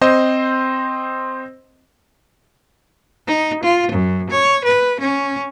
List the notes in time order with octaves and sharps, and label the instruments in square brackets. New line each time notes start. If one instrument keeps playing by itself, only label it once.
[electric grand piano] C4 C5 D#5 C6
[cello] D#4
F4
F#2
C#5
B4
C#4